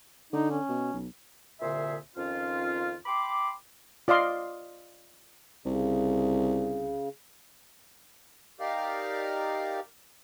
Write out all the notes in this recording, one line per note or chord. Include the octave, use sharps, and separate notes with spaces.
D3 D#4
C#4
B2
B1
C2 A#2 D3 G#4 C5 E5
F2 D#3 C#4 F4
G5 B5 C6 D6
F4 D5 D#5 F5 C6
C2 C#3
D#4 G4 A#4 D5 F5